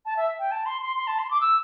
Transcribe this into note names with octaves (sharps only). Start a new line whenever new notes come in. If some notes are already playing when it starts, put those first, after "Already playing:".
A5
E5
G5
A5
C6
C6
C6
A5
C6
D6
E6